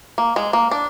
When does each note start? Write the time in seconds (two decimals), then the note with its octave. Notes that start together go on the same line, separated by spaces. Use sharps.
0.18 A#3
0.36 G#3
0.53 A#3
0.71 D4